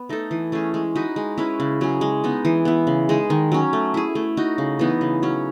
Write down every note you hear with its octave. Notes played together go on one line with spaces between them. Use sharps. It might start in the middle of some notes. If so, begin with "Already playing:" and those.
Already playing: B3
A3 D#4 A4
E3
A3 C#4 G#4
G#3
D#4 F#4 B4
G#3
C#4 E4 B4
C#3
F#3 C#4 G#4
G#3
B3 D#4
E3
B3 E4
C#3
G#3 D#4 G#4
D#3
F#3 C#4
A3
E4 G#4
A3
D#4 F#4
C#3
E3 B3 D#4
C#3
F#3 C#4